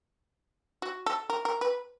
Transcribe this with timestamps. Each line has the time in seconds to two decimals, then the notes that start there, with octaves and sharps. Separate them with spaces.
0.82 F#4
1.06 A4
1.30 A#4
1.45 A#4
1.61 B4